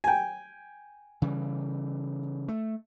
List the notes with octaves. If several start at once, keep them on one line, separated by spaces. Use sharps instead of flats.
G5 G#5
C#3 E3 G3
A3